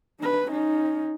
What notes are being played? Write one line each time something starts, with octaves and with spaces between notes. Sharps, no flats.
D4 B4
C#4 D#4